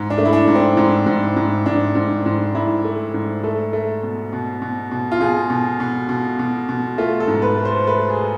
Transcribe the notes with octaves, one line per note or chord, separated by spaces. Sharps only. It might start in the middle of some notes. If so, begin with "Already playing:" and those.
Already playing: G#2
D4
A3
E4
D4
G#2
C4
G#2
G#2
G#2
G#2 D4
G#2
G#2
G#2 E4
A3
G#2
A3 A4
A3
B2
B2
B2
B2
F4
B2 G#4
B2
B2
B2
B2
B2
A3 F4
A4
G#2
B4
A3
C5
A3 B4
G#4